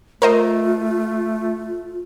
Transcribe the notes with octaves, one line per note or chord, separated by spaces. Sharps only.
A3 F4 A#4 C5 D#5